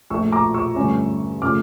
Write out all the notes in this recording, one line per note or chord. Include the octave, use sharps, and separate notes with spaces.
A#1 A#2 A3 C#6 E6
A#5 D6
C#6 E6
G2 D3 A3 C#4
C#3 F3 A3 D6 F6